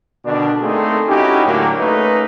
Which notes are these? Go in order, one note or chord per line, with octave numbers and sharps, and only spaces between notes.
B2 D3 D#3 D4
A3 A#3 C4 D#4 G#4 A4
C#4 D#4 E4 F#4 G4
A2 D3 F#3 A#3
A3 A#3 C#4 D#4 B4